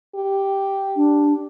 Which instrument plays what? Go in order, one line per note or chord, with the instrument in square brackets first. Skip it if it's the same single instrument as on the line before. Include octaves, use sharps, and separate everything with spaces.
[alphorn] G4
[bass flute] D4